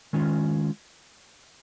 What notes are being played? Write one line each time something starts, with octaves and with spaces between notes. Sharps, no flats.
D#3 G#3 C#4 F4